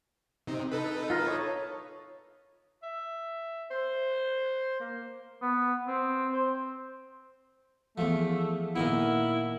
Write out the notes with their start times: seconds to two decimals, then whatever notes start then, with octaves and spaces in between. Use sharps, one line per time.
0.47 C3 C4 D#4
0.72 D#4 A4 B4
1.10 F4 A#4
1.27 C#5 C#6 D#6
2.83 E5
3.71 C5
4.80 A#3
5.42 B3
5.88 C4
6.33 C5
7.98 E2 F3 A3
8.76 A#2 D#3 B3 E4